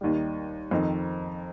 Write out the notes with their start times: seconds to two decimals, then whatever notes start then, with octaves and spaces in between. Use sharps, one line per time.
0.01 D#2 D#3 G3
0.71 F2 D#3 C4 D#4